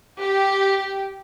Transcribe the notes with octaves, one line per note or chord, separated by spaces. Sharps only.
G4